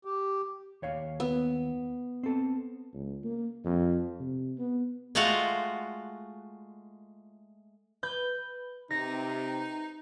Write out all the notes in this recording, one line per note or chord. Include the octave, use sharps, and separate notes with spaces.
G4
D#2 C#5 F5
B3
C4 A4
C#2
A#3
F2
C3
B3
G#3 A3 F4 F#4 F5 F#5
B4 G6
C3 D#4 A#6